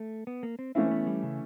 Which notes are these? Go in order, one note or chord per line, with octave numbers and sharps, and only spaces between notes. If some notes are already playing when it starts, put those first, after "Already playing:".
Already playing: A3
B3
A#3
C4
E3 A3 C4 C#4 E4
B3
G3
C#3